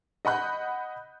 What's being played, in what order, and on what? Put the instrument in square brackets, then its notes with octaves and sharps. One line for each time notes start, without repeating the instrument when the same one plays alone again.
[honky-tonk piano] D#5 F#5 B5 F#6 G6